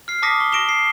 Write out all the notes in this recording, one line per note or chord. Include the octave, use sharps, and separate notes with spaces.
F6 C7
A5 D6 D#6 A#6 B6 C#7
C#6
C#6 A#6 D7 E7 G7
C7